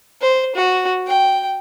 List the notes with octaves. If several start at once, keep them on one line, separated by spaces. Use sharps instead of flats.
C5
F#4
G5